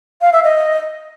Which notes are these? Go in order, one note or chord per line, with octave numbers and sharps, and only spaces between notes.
F5
E5
D#5